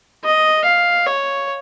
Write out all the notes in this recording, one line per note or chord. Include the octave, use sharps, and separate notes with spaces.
D#5
F5
C#5